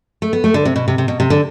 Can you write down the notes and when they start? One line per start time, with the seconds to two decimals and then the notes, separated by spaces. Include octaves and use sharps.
0.22 A3
0.33 B3
0.44 A3
0.54 D3
0.65 C3
0.76 B2
0.88 C3
0.98 C3
1.08 B2
1.20 C3
1.30 D3